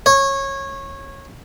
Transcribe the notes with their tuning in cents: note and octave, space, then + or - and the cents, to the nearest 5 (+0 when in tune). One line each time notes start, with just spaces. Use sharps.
C#5 -20